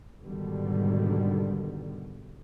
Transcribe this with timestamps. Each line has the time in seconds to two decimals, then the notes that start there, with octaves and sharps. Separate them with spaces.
0.23 G#2 B2 D3 D#3 G3